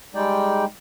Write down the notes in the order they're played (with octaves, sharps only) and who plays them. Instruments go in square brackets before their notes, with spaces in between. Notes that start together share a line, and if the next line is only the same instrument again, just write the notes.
[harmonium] G3 G#3 D#4 D5 G5